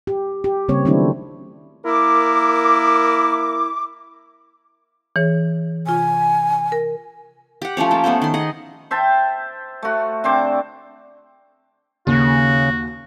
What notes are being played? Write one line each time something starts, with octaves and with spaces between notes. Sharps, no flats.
G4
G4
C#3 G3 A#3 C4 C#5
D#3 F#3 A3 C4 D4 E4
A#3 E4 A#4 D6
E3 G#4 C#5
C3 F4 G#5
A#4
G4 F#5
F3 A3 C#4 C#5
A#3 G5 A5
A3 B3 C#4 C5
D#3 C6
G#4 D#5 F#5
C5 E5 G5 A5
A3 F#4
D3 C4 C5 D6
D#2 C#3 F#4